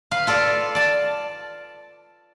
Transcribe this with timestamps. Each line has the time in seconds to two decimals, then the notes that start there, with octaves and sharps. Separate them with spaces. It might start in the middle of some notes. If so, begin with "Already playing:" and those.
0.11 B4 F5
0.27 F4 A4 D5 F5
0.75 D5 A5